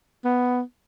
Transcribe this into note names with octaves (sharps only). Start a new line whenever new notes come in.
B3